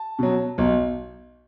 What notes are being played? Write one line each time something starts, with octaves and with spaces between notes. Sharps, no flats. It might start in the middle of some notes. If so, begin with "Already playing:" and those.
Already playing: A5
B2 F#3
B1